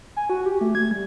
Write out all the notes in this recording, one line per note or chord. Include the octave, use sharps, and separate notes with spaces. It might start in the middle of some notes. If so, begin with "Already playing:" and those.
G#5
F#4
G4
A3
G#6
G3